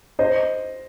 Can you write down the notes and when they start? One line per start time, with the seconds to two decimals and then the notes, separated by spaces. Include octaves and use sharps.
0.19 C5 D#5